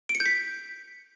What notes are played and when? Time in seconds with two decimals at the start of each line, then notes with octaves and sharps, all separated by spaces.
0.09 D7
0.15 C#7
0.20 G6
0.26 B6